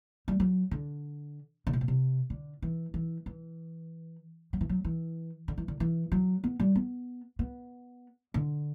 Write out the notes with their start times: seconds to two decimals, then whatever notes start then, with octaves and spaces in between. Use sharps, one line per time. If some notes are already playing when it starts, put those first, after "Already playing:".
0.28 G3
0.40 F#3
0.71 D3
1.67 D3
1.73 C3
1.81 B2
1.88 C3
2.30 D3
2.62 E3
2.94 E3
3.26 E3
4.53 F#3
4.61 E3
4.69 F#3
4.84 E3
5.48 D3
5.58 E3
5.68 D3
5.80 E3
6.12 F#3
6.44 B3
6.60 G3
6.76 B3
7.39 B3
8.34 D3